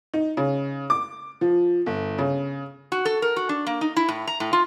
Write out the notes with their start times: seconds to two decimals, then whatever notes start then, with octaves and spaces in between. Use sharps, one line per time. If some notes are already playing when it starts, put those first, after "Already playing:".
0.14 D#4
0.37 C#3
0.90 D6
1.41 F3
1.86 G1
2.18 C#3
2.92 F#4
3.05 A4
3.22 A#4
3.36 F#4
3.49 D4
3.67 A#3
3.81 D#4
3.96 E4
4.08 A2
4.27 A#5
4.40 A2
4.53 F4